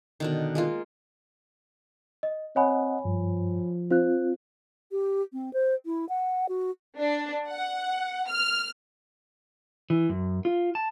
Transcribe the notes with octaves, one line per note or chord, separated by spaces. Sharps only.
B2 D3 D#3
G#3 A#3 F4
D#5
C4 C#5 D#5 F#5 G#5 B5
G2 F3
C4 F4 C5 F#6
G4
C4
C5
E4
F#5
F#4
D4
F#5
F6
E3
F#2
F4
A5